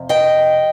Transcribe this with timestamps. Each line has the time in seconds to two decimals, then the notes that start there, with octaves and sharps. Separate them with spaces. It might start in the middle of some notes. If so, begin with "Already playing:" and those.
Already playing: F2 C3
0.09 D#5 G5